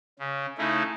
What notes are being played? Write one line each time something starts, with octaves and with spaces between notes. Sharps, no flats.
C#3
C#3 A3 D#4 E4